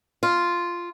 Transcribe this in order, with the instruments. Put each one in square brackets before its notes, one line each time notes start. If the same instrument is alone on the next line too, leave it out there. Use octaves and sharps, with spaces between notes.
[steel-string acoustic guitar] F4